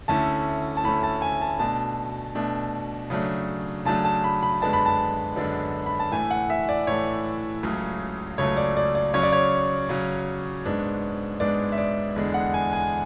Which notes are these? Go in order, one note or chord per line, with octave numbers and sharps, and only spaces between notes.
D2 D3 A3 C#4 E4 A5
A5
D2 D3 A3 C#4 E4 B5
A5
G#5
A5
B2 A3 D4 A5
B2 A3 D4
C#3 F#3 A3 D4
C#3 F#3 A3 D4 A5
A5
B5
B5
F#2 D3 G#3 B3 D4 A5
B5
A5
F#2 D3 G#3 B3 D4
B5
A5
A2 E3 A3 G#5
F#5
E5
D5
A2 E3 A3 C#5
C#2 C#3 F#3 A3
C#2 C#3 F#3 A3 C#5
D5
D5
D5
C#3 F#3 C#4 C#5
D5
C#5
C#3 F#3 C#4
G#2 G#3 B3 D4
G#2 G#3 B3 D4 D5
E5
D5
E2 D3 G#3 D4
F#5
G#5
G#5